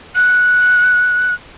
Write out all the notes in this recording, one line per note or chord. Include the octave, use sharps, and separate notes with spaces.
F#6